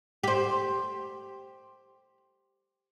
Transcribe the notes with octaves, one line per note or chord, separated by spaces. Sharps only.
G4 C5